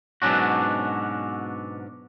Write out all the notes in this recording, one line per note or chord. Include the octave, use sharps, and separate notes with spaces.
G#2 B2 F#3 C#4 D4 F#4